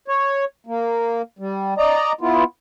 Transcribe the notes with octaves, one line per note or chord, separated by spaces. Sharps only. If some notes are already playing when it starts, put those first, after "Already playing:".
C#5
A#3
G3
D5 D#5 A#5
B3 E4 F4